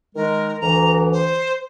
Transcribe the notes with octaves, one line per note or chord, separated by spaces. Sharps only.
D#3 G#3 A#4
D2 E3 A#5
C5